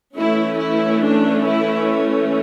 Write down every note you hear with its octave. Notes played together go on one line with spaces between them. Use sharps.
E3 A3 C#4 E4
E4
D4
E4